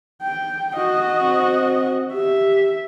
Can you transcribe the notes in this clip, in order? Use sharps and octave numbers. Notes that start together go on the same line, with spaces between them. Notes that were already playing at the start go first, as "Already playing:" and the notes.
G5
F#4 D#5
C4
G4 E5